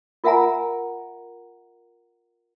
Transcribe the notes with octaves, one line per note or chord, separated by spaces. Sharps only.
F4 A#4 E5 F#5 G#5 A#5